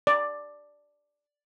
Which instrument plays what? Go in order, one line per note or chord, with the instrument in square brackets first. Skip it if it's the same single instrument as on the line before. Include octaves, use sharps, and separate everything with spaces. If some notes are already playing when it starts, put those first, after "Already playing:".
[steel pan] D5